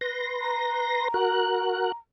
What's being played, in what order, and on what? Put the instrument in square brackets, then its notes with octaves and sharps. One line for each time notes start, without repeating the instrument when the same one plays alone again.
[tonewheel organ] B4 C6 A#6
[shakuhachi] A#5
[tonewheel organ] F#4 A#4 F#6